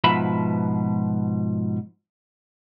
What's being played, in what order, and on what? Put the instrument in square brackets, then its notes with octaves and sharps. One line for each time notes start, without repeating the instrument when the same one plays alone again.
[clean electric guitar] G#2 B2 F3 B4 E5 B5